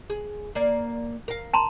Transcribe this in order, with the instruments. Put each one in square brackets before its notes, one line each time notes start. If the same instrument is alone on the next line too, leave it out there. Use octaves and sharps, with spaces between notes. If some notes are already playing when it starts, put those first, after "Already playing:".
[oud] G#4
A#3 D5
A#4 F5
[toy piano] A5 A#5 C6